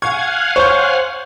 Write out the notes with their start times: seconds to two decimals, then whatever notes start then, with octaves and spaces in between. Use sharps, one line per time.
0.02 F5 F#5 G#5 C#6 G#6
0.56 C5 C#5 C#6 G6